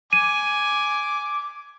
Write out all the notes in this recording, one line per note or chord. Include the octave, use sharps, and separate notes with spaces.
G#5 D6 D#7